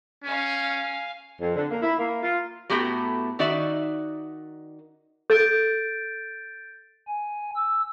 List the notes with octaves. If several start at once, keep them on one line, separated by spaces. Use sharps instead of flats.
C#4 F5 G#5
F2
D3
A#3
E4
A#3
F4
A2 A3 B3 F#4 G4 A#5
D#3 D#4 F#4 D5 E5
A4 G6 A6 D7
G#5
E6